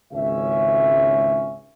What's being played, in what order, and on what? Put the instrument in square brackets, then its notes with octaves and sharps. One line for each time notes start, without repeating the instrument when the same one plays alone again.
[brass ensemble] G#1 C#2 C#4 E5